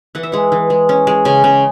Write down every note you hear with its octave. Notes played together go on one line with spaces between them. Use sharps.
E3 F#5
E5
G#3 F#5
E3
G#3
C#4
G#3
C#3 G#5
C#3